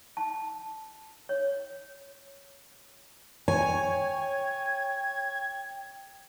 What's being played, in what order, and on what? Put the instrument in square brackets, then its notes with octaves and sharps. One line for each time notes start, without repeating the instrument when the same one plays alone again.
[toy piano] A5
C#5
[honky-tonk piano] C#5 [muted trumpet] G5 [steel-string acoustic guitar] G#5 [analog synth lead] G#6